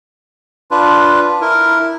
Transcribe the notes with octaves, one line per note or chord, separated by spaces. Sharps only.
D4 F4 B4
E4 A#4